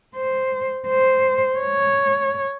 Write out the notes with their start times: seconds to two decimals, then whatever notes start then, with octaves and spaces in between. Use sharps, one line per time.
0.16 C5
0.87 C5
1.59 C#5